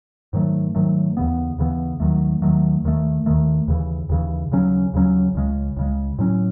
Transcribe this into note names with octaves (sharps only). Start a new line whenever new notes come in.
G#2 D#3 F#3 A3
G#2 D#3 F#3 A3
D#2 C#3 E3 B3
D#2 C#3 E3 B3
D#2 D#3 F#3 A3
D#2 D#3 F#3 A3
D#2 D#3 A3
D#2 D#3 A3
D#2 C#3 E3
D#2 C#3 E3
D#2 C#3 F#3 C#4
D#2 C#3 F#3 C#4
C#2 C#3 G#3
C#2 C#3 G#3
A2 F#3 C#4